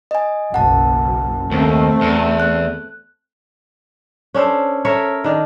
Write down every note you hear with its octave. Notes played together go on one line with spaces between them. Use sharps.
D#5 G#5
F#1 B1 F#2 F#5 A5
D#2 A3 C4
E2
F#6
C#4 D4 A4 C5
A4 A#4 C#5 E5
D#3 D4